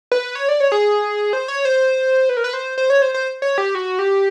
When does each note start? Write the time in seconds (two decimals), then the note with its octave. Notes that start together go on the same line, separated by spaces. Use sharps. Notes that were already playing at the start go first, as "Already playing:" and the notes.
0.12 B4
0.35 C#5
0.49 D5
0.60 C#5
0.72 G#4
1.33 C5
1.48 C#5
1.65 C5
2.29 B4
2.37 A#4
2.44 B4
2.53 C5
2.78 C5
2.90 C#5
3.02 C5
3.14 C5
3.42 C#5
3.58 G4
3.75 F#4
3.99 G4